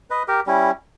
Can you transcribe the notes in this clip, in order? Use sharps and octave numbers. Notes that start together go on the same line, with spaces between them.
B4 D#5
G4 A#4
G3 C#4 E4